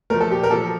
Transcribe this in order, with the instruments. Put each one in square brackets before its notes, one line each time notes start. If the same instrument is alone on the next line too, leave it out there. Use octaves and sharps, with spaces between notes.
[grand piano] F3 A3 A#4
A4
A#2 G4
A#4
F3 A#3 A4